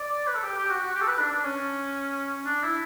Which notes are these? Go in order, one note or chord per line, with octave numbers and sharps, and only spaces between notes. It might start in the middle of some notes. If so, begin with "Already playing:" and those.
Already playing: D5
B4
A4
G4
G4
F#4
F#4
G4
A4
B4
D4
D4
C#4
D4
E4